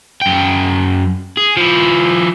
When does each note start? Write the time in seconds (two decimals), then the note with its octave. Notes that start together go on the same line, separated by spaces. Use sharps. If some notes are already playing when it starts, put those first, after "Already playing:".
0.22 F#2 G5
1.37 G#4
1.57 F3 E4